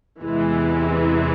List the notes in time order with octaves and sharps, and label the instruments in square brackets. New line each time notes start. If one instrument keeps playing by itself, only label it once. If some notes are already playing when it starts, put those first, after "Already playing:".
[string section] E2 C3 E3 G#3